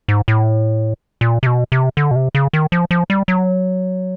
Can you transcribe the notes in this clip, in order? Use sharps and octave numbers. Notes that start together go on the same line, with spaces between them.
G#2
A2
A#2
C3
B2
C3
D3
B2
C3
C#3
D#3
F3
F3
G3
F#3